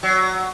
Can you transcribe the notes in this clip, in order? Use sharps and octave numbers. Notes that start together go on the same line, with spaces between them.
F#3